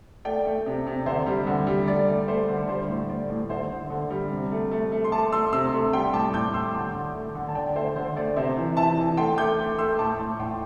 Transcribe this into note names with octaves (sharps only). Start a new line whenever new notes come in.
A3 D5 G5
A3
C3
C3
D3 C5 E5
G3
D3
G3
A3 D5
A3
A3 C5
D3
G3 C5
A2
A2 D5
A2
D3 C5 E5
D3
D3
G3
C3
A3
A3
A3
C6
A3 A5 D6
A3 C6 E6
C3 C6 E6
A3
G3 G5 C6
A2 A5 D6
A2 D6 G6
A2 C6 E6
D3 A5 D6
D3
A3
D3
A5
D3 D5 G5
A3 C5 E5
D3 C5
A3 D5
C3 C5 E5
E3
E3 E5 A5
E3
A3 G5 C6
A3 D6 G6
A3
A3 C6 E6
A2 A5 D6
A2
A2 G5 C6